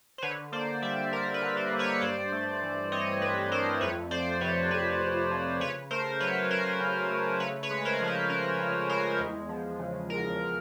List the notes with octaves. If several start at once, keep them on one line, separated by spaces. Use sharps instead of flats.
C5
D3 B4 C#5
A#3 C5 D5
G3 D5 E5
D3 A#4
B4
D3
A#4 C5
A#3
B4 C#5
G2 C5 D5
A3
E3
C4 C#5 D#5
G2 B4
A3 A#4 C5
F2 B4 C#5
F3 C5 D5
C3 B4 C#5
F2 B4
F2
F3
C#3 B4 C#5
A3 A#4 C5
F#3 B4 C#5
C#4 A#4 C5
C#3
A3
C#3 B4 C#5
B4 C#5
G#3
A#4 C5
F3
B4
C#4 A#4
C#3
G#3 A#4 C5
E2
F3
C#3
E2 A#4